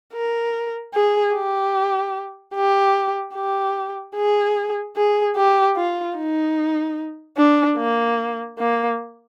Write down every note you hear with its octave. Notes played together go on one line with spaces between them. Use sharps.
A#4
G#4
G4
G4
G4
G#4
G#4
G4
F4
D#4
D4
A#3
A#3